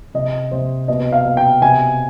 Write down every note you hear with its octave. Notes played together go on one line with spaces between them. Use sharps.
C3 D#5
C3 C5
B2 D#5
F5
B2
G5
C3 G#5